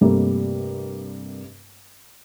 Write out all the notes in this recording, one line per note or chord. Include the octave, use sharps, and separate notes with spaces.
G2 C3 G3 A3 A#3 A#4